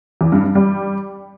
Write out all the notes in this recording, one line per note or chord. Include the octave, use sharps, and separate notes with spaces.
E2
G2
G2
G3